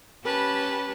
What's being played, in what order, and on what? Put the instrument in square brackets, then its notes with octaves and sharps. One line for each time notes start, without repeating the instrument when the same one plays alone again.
[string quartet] C#4 G4 B4 A5 B5